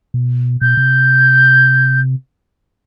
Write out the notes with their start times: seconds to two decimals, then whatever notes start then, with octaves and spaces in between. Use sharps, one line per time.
0.14 B2
0.61 B2 G6
0.77 C3